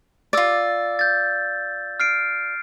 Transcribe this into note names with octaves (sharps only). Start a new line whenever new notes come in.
F4 D5 E6 A6
G6 A6
F6 C7 D7